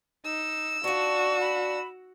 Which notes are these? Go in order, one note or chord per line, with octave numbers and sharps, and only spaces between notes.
D#4 E6
D4 F4 F#4 C#6
B5